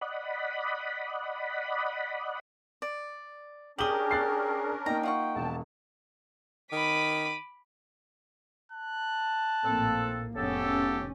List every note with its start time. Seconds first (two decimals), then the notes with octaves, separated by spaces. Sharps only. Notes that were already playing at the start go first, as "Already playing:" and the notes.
0.01 D5 D#5 F#5 B5
2.82 D5
3.78 C#4 D4 G4 G#4 A#4 D#6 F#7 G7
4.11 F#6 A6 C7
4.86 A#3 D#4 G5 A#5
5.03 F4 F#5 C#6
5.35 E1 F2 A#2 A5
6.72 D#3 B5 D6 B6 D#7
8.72 A5 F#6
9.64 A#1 A2 A#3 C4 A4
10.35 F1 C#3 B3 C#4 G4 A4